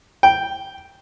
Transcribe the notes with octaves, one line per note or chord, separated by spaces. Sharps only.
G5